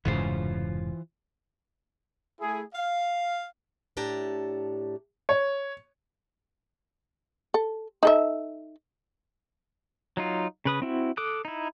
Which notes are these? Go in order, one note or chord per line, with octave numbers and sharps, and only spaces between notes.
F1 G#2 C#3 E3 F4 C5
A3 E4 G#4
F5
A2 D4 G4 A5 A#5
C#5
A4
D#4 A4 E5
F#3 D#4 F4
C#3 B4 D#6
C4 E4 F#4
A4 D6 D#6 F#6
D#4 E4